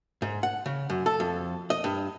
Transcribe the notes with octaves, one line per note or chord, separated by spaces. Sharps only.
G#2
F#5
C#3
F#2
A4
F2
D#5
G2